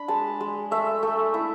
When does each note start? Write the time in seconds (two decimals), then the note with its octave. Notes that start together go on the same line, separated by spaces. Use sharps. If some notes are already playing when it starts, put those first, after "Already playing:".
Already playing: D4 B5
0.08 G#3 A5
0.41 G#3
0.71 A3 E5
1.03 A3
1.34 E4